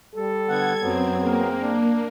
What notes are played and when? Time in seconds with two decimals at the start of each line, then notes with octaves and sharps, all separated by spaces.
0.15 G3 A4
0.49 D3 B3 F#5 G#6
0.81 F#2 F#3 B3 C4
1.21 A#3 C4 G#4 A#4
1.61 D4